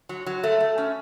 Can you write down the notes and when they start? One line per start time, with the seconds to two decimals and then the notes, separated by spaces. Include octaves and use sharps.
0.09 F#3
0.26 F#3
0.43 A3
0.60 A3
0.78 C#4